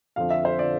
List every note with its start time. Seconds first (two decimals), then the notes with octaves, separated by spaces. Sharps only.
0.16 F2 D3 F3 F5
0.30 E5
0.45 C5
0.59 D3 F3 D5